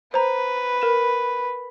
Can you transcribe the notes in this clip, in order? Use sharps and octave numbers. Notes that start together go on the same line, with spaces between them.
B4 C5 A#5
A#4 E7